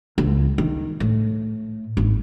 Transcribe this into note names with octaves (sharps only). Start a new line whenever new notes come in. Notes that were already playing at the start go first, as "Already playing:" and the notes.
C#2
D#3
A2
G#1